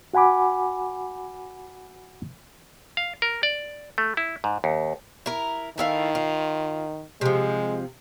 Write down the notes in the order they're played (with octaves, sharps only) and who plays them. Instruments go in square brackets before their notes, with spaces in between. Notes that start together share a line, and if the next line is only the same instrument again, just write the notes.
[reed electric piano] F#4 F#5 G#5 B5 D6
[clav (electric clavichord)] F5
A#4
D5
A3
E4
G#2
D#2
[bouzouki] E4 A#4
[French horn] D#3 [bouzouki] A3 E4 F5
[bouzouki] F4
[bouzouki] C3 F3 [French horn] G#3